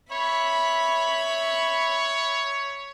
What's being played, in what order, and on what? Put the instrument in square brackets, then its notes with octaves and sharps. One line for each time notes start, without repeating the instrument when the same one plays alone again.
[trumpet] C#5 [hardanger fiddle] E5 B5